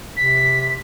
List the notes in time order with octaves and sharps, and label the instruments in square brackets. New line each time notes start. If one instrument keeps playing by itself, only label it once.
[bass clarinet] C3 [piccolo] B6